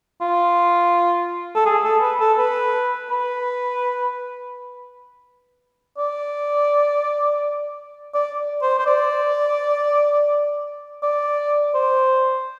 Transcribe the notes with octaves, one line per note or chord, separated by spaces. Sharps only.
F4
A4
G#4
A4
B4
A4
B4
B4
D5
D5
C5
C5
D5
D5
C5